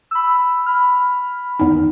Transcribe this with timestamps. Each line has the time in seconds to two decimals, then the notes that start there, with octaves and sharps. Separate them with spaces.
0.11 B5 E6
0.66 B5 F6
1.60 E2 D#3